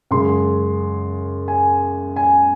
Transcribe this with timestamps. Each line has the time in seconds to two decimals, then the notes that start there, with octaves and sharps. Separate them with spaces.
0.11 F#2 C#3 G#3 C6
1.48 G#5
2.16 G#5